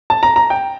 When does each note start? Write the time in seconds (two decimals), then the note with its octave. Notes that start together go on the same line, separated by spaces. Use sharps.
0.10 A5
0.23 A#5
0.36 A#5
0.50 G5